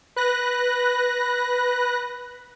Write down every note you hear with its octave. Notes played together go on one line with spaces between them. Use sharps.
B4 F#6 A#6